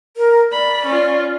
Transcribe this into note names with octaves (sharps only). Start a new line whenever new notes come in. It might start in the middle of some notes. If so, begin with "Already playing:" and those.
A#4
D5 B5
C#4 F4